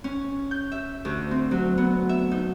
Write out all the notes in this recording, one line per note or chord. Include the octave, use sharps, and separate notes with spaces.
C#4
G6
E5
D2
C4
F#3
B3
E5
D#4